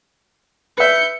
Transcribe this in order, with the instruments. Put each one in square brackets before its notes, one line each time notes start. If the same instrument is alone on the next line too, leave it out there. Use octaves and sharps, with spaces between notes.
[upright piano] B4 E5 [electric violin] G6 C#7